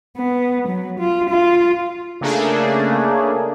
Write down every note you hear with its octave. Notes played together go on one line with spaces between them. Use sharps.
B3
F#3
F4
F4
C#3 A3 A#3 D4 G#4